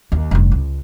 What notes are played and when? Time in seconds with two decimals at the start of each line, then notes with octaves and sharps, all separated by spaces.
0.12 D#2
0.31 F1 G2
0.51 C#2